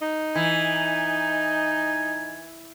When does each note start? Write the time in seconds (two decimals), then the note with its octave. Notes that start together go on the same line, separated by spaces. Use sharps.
0.01 D#4
0.35 E3 G#5